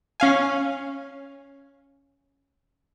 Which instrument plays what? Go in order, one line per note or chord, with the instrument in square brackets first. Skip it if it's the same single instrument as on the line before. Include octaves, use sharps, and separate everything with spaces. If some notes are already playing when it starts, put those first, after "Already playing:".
[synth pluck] C#4 F5 G#5